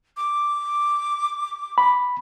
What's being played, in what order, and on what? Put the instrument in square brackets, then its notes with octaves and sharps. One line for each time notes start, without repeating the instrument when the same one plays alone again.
[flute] D6
[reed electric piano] B5